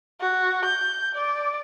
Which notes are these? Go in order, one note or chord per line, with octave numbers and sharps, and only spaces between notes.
F#4
G6
D5